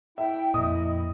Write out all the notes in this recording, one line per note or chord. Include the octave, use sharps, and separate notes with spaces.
E4 E5 G5
F2 A#2 D#5 D#6